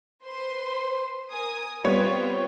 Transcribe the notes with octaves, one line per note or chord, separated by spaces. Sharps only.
B4 C5 C6
A#4 G#5 D#6
G3 B3 C4 F4 C#5 G5